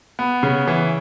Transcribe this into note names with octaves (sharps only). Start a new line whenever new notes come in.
B3
C#3
E3